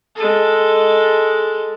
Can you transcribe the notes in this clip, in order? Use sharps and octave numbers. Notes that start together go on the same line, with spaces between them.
G#3 A4